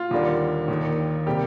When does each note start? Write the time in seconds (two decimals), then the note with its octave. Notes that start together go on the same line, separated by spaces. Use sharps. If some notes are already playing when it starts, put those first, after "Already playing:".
Already playing: F4
0.11 D#2 D3 G3 A#3 D4
0.68 D#2 D#3 A#3
1.26 C3 G3 A#3 G4